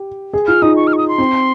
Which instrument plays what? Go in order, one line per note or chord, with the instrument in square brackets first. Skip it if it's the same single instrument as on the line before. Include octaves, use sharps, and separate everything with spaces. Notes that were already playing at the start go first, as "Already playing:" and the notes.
Already playing: [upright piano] G4
G#4
[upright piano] F4 [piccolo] F6
[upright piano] D#4 [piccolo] D#6
[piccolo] C#6
F6
C#6
D#6
C6
[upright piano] C4